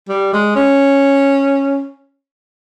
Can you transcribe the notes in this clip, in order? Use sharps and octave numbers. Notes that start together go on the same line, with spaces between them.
G3
G#3
C#4